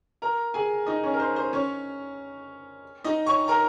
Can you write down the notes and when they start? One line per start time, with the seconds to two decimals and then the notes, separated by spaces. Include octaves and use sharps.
0.22 A#4 A#5
0.54 G#4 G#5
0.87 D#4 D#5
1.03 C#4 C#5
1.14 A#4
1.20 C5
1.36 C5
1.53 C#4 C#5
3.04 D#4 D#5
3.26 C#5 C#6
3.48 A#4 A#5